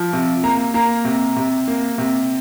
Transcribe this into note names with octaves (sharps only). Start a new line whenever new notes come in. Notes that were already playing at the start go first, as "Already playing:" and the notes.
Already playing: F3
C3
A#3 A#5
A#3 A#5
C3
C3
A#3
C3